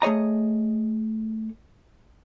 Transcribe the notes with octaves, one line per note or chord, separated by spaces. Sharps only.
A3 G#4 C#5 D#5 A#5